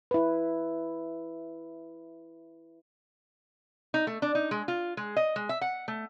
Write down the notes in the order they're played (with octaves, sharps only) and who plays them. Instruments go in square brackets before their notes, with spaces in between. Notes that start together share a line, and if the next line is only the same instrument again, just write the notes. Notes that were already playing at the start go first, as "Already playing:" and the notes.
[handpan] E4 B4
[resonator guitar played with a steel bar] D#4
A3
D4
D#4
G#3
F4
G#3
D#5
G#3
E5
F#5
A3